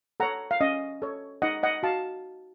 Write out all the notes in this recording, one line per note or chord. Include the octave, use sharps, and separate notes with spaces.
A4 C#5 F#5 A#5
F5
C#4 D#5
A4 C#5
D#4 D#5 F#5
D#5 F#5
F#4 F5 A5